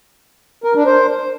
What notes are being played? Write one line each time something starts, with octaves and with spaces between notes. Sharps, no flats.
A#4
D4
C5